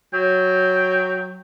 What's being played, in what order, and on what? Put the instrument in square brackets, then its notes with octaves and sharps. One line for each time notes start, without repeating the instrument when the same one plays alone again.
[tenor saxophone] F#3 [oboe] G5